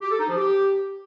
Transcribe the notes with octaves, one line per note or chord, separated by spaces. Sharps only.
G4
A4
D#4
F3
G4